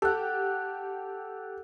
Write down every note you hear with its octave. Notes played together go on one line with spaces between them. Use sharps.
G4 A4 F#5